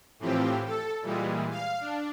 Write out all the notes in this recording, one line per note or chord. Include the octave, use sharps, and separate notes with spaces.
A2 E3 F3 C4 G4
A4
A#2 E3 G3 G#3
F5
D4